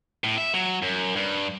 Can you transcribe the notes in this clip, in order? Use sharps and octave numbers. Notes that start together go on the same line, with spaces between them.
A2
E5
F#3
F#2
G2